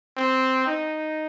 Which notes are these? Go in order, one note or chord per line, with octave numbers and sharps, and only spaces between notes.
C4
D#4